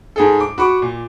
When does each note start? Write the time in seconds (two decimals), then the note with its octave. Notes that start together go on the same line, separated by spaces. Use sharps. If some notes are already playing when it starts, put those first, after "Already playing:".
0.16 G#2 G#4 A4
0.40 D6
0.58 F#4 B5 C#6 D6
0.82 A#2